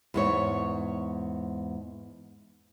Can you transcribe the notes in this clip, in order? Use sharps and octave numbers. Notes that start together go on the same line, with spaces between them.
E2 G#2 C#5